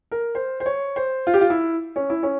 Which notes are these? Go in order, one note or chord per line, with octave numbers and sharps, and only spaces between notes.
A#4
C5
C5
C#5
C5
F4
G4
F4
E4
C#4
E4
C#4